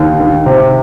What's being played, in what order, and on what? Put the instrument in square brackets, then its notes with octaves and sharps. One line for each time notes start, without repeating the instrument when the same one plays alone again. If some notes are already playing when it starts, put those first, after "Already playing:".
Already playing: [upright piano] D#2
D#3
C3